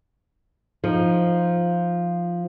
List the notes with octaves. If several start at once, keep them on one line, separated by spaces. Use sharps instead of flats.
F3 D#4